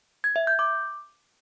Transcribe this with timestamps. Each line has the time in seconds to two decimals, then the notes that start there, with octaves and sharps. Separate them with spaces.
0.24 G#6
0.36 E5
0.47 G6
0.59 D6